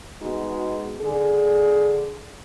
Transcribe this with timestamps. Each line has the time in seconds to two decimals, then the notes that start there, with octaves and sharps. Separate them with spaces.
0.22 G#3 B3 D#4 F#4
1.01 D3 D4 G#4